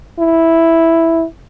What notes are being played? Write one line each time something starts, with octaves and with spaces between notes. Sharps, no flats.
E4